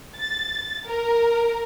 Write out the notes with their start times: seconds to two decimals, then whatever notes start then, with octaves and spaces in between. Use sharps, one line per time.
0.18 A6
0.86 A#4